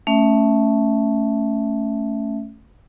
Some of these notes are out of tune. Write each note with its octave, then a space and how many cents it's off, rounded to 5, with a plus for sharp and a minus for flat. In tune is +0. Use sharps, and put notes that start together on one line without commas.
A3 +0 C#4 -5 E5 +0